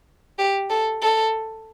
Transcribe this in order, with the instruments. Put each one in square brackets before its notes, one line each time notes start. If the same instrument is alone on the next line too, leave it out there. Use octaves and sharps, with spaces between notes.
[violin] G4
A4
A4